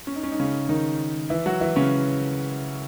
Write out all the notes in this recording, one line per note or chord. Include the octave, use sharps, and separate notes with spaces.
C#4
D#4
C#4
D#4
C#3 C#4
D#3 D#4
E3 E4
F#3 F#4
E3 E4
C#3 C#4